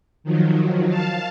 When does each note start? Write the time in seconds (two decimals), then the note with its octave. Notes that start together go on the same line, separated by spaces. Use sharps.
0.24 D#3 F3 F#3
0.88 F5 A5